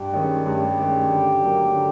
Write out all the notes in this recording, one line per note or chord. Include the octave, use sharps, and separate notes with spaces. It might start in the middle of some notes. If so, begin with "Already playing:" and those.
Already playing: G2 G4
D#3 G#3 C#4
G2 G4
D#3 G#3 C#4
D3
F#3 A#3
D3